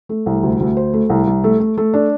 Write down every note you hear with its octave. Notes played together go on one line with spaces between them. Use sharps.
A3
C2
D2
D2
C5
A3
C2
C2
A3
A3
A3
D4